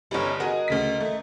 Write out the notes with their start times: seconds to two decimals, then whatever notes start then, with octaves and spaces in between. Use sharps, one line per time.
0.11 G1 G3 C#4 D#4 E4
0.40 F#4 G#4 A#4 D#5
0.68 D2 C#3 B6
1.01 A3